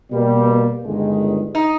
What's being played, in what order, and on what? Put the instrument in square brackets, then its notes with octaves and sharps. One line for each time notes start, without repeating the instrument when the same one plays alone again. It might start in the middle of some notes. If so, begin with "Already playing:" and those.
[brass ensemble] B2 G3 A#3
G1 G2 D#3 G#3
[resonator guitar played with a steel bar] D#4